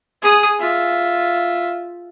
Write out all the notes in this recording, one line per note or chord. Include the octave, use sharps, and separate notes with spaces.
G#4 D#6
F4 E5